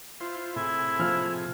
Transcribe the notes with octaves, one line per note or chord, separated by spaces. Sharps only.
E4 F4 C5
A2 C3 E4 G#4
F3 F6